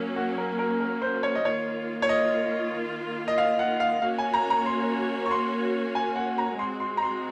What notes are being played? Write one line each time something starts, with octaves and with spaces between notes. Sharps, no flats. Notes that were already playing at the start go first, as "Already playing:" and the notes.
Already playing: F#3 A#3 C#4
F#4
A#4
A#4
A#4
C5
C#5
D#5
D#3 A#3 F4 C#5
C#5
D#5
D#5
F5
F#5
F5
A#3 C#4 F#4 C#5 F5
G#5
A#5
A#5
C6
C#6
C6
G#5
F#5
A#5
G#3 C4 F#4 C6
C6
A#5
C6